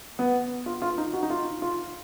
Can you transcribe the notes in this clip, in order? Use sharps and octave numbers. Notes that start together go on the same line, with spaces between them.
B3
F4
F4
D#4
F#4
D#4
F4
F4